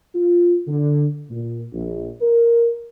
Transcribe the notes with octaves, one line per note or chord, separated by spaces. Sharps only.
F4
D3
A#2
A#1
A#4